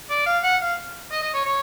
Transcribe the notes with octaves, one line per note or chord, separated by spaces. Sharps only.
D5
F5
F#5
F5
D#5
D#5
C#5
C#5